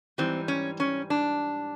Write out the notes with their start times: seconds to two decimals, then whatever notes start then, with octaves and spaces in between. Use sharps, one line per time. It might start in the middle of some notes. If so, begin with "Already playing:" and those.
0.18 G#2 E3 G3 C4
0.48 C#4
0.80 C#4
1.10 D4